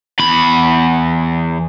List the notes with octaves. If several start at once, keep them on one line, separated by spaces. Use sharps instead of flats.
E2 B5